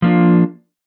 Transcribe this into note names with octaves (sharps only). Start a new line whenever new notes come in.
F3 A#3 D4 F4